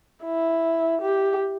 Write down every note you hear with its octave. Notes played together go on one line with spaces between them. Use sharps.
E4
G4